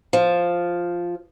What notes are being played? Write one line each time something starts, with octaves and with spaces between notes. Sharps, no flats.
F3